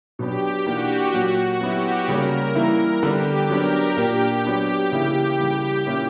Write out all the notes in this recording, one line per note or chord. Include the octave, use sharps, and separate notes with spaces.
B2 F#3 B3 D4 G4
E3 A#3 D4 F#4
A#2 F#3 A#3 F#4
F#3 B3 E4 G4
C#3 G3 A#3 C#4 A#4
E3 G3 A#3 E4
D3 G3 B3 D4 G4
F#3 B3 D4 A#4
A#2 A#3 D4 G4
F#3 B3 D4
C#3 E3 A#3 E4
C#3 E3 G3 A#3
A#2 A#3 C#4 E4